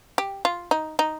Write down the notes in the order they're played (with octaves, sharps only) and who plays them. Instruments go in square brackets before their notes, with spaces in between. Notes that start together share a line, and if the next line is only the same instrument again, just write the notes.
[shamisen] G4
F4
D#4
D#4